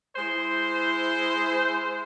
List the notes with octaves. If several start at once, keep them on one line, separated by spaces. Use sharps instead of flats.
G#3 E4 C5